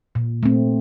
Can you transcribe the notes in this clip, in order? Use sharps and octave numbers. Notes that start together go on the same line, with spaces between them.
A#2
A3 C4